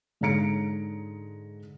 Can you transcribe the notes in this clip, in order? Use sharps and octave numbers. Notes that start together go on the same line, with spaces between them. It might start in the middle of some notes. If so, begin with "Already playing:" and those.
G#2 D3 C#5 A#5 C#7 D7